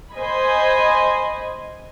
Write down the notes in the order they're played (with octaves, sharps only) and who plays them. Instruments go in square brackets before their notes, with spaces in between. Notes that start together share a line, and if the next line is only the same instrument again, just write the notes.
[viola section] C5 D#5 G#5 B5